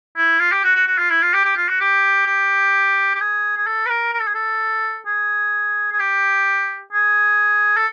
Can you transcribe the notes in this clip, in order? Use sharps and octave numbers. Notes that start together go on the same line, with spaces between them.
E4
F4
G4
F#4
F#4
F#4
F4
E4
F4
G4
G4
F4
F#4
G4
G4
G4
G#4
G#4
A4
B4
A#4
A#4
A4
G#4
A4
G#4
G#4
G4
G#4
A4